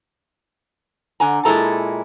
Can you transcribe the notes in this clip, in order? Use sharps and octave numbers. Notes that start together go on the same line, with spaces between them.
D3 G#5 A#5
A#2 G#3 D#4 E4 A4 A#5